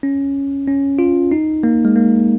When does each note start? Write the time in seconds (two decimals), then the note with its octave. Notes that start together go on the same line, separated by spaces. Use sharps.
0.03 C#4
0.67 C#4
0.99 F4
1.32 D#4
1.63 A#3
1.85 G#3
1.96 A#3